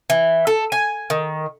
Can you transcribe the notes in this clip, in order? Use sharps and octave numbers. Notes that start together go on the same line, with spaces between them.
E3
A4
G#5
D#3